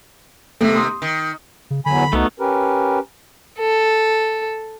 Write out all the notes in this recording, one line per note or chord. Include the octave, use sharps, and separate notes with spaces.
D#2 C3 A3 B3
C6 D#6
D#3
C#3
E2 D3 F#3 G#5 B5
C2 A3 B3 D#4 F#4
C#4 G4 A#4 B4
A4